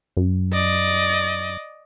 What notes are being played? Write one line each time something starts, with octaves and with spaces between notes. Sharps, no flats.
F#2
D5 D#5